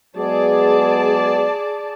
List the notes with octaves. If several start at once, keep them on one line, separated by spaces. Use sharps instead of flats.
F#3 G#3 B3 G#4 D5 A5